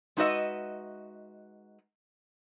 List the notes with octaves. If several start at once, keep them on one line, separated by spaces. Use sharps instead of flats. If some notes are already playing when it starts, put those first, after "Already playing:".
G#3 D#4 F#4 B4 D#5 E5